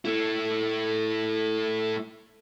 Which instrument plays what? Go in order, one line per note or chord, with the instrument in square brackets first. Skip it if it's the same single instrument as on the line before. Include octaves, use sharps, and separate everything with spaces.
[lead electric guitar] A3 E4